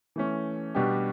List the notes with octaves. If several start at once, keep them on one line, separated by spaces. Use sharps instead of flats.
E3 A3 C#4
B2 G3 D4 G4